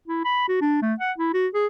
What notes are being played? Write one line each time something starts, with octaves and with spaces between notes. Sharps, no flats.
E4
B5
F#4
D4
A3
F#5
E4
F#4
G#4